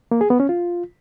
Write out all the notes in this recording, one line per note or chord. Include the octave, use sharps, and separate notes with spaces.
A#3
G#4
B3
C#4
F4